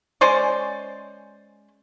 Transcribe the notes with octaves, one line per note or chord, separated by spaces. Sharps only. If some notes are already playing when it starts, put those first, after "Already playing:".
G#3 C#4 C5 D5